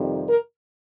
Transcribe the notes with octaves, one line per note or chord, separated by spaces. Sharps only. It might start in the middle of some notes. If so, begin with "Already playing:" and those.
Already playing: F2 C3 D#3 G3
A#4